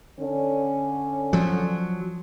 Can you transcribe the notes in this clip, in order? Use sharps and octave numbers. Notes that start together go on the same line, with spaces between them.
D3 C#4
F3 F#3